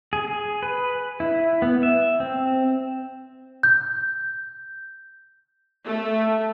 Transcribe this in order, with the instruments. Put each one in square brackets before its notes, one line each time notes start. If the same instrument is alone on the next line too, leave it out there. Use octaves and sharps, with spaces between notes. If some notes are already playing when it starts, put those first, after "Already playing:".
[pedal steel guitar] G#4
G#4
B4
E4
B3
E5
C4
[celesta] G6
[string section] A3